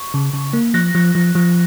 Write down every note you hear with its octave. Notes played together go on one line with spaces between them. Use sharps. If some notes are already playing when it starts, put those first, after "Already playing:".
Already playing: C#6
C#3
C#3
A#3
F3 F#6 A#6
F3
F3
F3